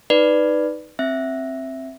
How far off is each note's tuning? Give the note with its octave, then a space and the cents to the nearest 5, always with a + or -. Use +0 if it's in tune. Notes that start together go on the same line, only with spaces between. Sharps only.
D#4 +0 B4 +0 D5 +5
C4 +15 E5 +0